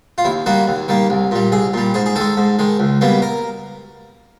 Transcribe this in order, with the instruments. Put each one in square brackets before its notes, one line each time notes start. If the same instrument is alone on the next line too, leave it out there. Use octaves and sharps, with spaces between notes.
[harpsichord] F4
D#2 E4
D#3 G3 A#3 F#4
D#2
D#3 G3 A#3
C2
A#2 G3
C2 G#4
A#2 G3
G#2 G#4
G#4
D#3 G#3 A4
G#2
D#3 G#3
C#2
B2 G3 A#3
A#4